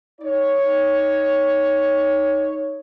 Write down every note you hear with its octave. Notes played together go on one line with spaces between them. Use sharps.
D#4 C#5